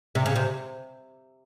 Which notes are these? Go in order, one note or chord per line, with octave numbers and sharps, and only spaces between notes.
C3
C#3
C3